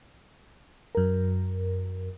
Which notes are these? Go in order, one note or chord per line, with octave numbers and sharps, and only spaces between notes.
F#2 A#4